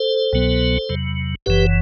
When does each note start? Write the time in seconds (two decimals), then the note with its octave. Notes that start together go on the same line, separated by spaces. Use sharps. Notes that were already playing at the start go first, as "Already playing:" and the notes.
Already playing: A4 C5
0.33 C2 B2 F#3 B3
0.89 E2 C3 F#3
1.46 F#1 F#2 E3 G4 B4